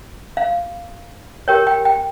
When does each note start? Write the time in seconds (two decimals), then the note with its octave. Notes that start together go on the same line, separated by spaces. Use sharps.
0.37 F5
1.48 G4 A#4 C#5 G5
1.67 G5
1.85 G5